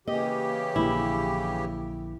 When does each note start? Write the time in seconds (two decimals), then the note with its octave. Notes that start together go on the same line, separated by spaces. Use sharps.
0.08 C#3 E3 A#3 G4 D#5
0.76 A#1 D3 A#3 E4